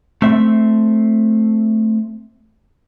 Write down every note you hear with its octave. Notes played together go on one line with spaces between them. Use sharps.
A3 C4 E5